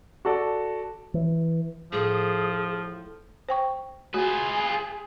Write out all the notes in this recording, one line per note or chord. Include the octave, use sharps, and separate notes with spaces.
F#4 A4 D5
E3
A2 F3 G#4 A4
C5 G5 C#6
A3 F4 F#4 G#4 B4